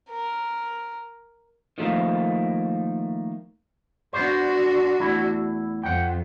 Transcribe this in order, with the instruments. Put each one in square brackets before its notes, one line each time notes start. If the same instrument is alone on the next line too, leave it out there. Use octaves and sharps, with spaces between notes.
[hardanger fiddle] A#4
[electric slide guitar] D#3 F3 A3 A#3
[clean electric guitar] B3 C5 [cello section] D4 F#4
[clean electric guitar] E2 A3 E4
[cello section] F2 [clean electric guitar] F#5 G5